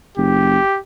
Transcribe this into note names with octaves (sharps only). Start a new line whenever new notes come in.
F#1 G4